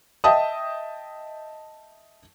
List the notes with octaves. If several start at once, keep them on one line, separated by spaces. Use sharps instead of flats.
D#5 E5 G5 A5 D#6